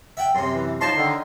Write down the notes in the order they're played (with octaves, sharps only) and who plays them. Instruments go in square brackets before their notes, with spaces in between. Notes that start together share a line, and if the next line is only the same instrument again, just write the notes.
[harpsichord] E5 F#5 G5
[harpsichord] F#2 C3 [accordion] C6
[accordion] E3
[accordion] F3 A5 [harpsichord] D#4 C#5 D#5 [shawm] C6
[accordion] D3 D#3